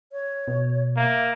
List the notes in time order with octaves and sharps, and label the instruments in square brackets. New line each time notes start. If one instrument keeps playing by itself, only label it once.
[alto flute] C#5
[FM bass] B2
[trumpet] A#3 [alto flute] E5